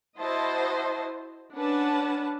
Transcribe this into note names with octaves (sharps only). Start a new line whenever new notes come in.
E4 F#4 C5 D#5 A5
C#4 D4 B4 F#5 A5